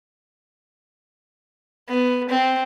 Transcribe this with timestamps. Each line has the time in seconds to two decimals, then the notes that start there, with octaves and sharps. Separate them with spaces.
1.89 B3
2.29 C4